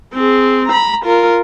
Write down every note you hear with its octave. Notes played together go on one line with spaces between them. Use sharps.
C4 G#4
A#5 B5
F4 A#4